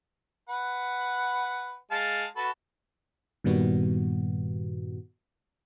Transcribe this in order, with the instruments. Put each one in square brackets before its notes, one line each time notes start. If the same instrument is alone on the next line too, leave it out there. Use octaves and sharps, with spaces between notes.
[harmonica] B4 F#5
G#3 F5 A5
F#4 A4 B4
[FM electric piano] G2 A#2 D#3 G3 B3 F#4